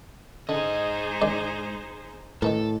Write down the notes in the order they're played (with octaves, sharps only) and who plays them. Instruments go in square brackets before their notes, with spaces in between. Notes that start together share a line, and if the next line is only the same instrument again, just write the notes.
[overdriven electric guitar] G#2 D#5 [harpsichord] D3 [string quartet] D#4 G#4 C5
[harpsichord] D#3 G#3 D5
[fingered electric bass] A2 [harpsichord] D#3 E3 A#4 [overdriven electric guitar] A4